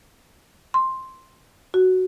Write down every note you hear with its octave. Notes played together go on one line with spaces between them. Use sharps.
C6
F#4